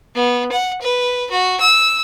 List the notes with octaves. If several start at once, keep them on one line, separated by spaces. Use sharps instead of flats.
B3
F#5
B4
F#4
E6